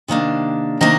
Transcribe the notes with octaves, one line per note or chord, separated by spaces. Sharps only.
C3 D#3 A#3 D4
C3 D#3 A#3 D4 D#5